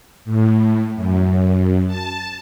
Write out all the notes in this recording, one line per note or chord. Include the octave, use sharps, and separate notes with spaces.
A2
F#2
A5